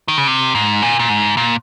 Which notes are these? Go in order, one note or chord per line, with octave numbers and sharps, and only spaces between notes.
D#3
C#3
C3
G#2
A#2
A#2
G#2
A#2